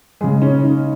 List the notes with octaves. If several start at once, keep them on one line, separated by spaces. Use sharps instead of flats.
C#3 G#3 G#4
C#4
D#4